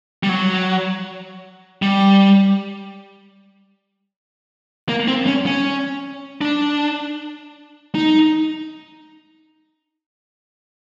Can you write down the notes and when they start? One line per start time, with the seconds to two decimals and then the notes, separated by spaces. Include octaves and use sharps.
0.23 G3
0.29 F#3
1.82 G3
4.89 A#3
5.08 C4
5.27 C#4
5.46 C#4
6.41 D4
7.95 D#4